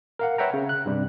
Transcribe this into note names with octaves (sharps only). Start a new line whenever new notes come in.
A#4 F5 F#5
B4 C#5 E5 F#5 G5 A#5
C#3
F#6
G2 C3 G3